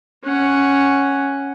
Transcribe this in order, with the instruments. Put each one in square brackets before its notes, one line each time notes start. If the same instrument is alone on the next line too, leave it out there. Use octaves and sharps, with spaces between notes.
[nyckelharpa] C#4 F#5